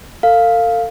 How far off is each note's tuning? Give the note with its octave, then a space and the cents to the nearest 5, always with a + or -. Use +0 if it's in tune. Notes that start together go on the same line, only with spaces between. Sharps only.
A4 +40 F5 +0